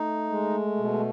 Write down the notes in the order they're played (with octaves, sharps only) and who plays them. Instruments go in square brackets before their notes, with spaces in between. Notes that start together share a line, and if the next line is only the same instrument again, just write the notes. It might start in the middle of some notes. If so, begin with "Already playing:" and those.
Already playing: [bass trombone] A3 [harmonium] D#4
[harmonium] G#3
B2